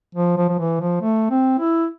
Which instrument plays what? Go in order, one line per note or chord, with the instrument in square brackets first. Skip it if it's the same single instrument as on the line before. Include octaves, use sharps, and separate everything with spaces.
[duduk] F3
F3
F3
E3
F3
A3
C4
E4